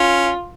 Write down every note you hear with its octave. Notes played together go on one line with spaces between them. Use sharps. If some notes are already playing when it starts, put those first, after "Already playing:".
Already playing: C#4 F4